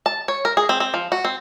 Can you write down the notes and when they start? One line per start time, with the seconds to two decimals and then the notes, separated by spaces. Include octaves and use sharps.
0.06 A5
0.28 C#5
0.45 A#4
0.57 G#4
0.69 C4
0.80 C4
0.94 F3
1.12 F#4
1.25 C4